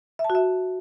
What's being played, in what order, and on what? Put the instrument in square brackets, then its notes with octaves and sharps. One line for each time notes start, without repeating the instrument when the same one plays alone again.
[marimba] E5
A5
F#4
E5